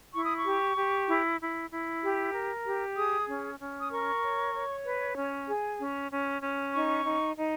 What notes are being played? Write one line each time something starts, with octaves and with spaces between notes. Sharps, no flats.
E4 C#6
D#6
C#6
G4
G4
E4
E4
E4
G4
A#4
G4
G#4 D#6
C#4
C#4
D#6
A#4 C#6
C#5
C#5
B4
C#4
G#4
C#4
C#4
C#4
D#4 C#6
D#4
D#4